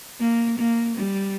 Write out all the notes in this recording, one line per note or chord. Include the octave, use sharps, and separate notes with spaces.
A#3
A#3
G3